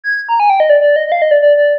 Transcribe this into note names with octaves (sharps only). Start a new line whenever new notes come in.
G#6
A#5
G#5
G5
D#5
D5
D5
D#5
D#5
F5
D#5
D5
D5
D5